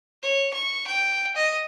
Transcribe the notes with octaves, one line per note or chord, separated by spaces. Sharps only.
C#5
C#6
G5
D#5